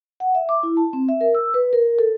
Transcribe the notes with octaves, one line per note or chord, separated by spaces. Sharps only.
F#5
E5
D6
E4
A5
C4
E5
A#4
E6
B4
A#4
A4